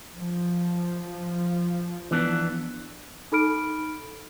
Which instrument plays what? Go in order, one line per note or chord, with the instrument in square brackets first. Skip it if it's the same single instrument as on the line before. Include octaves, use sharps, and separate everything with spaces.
[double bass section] F3
[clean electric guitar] E3 B3 D4
[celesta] D#4 A4 B5 F6 D7